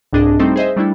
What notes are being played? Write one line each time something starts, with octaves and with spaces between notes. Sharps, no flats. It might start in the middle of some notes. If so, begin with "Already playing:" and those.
C2 G#2 D4 G#4 D#5
G3 A3 C4 D#4 A4 C5
G#4 C5 D#5 E5
G3 A3 D4 E4 A4